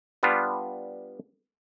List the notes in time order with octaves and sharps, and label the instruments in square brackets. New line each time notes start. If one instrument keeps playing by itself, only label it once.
[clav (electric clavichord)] G3 B3 D4 F4